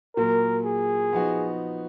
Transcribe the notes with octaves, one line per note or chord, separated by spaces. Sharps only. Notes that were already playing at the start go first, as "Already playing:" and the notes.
A#2 F#3 A#3 A#4
G#4
F3 B3 D#4 F#4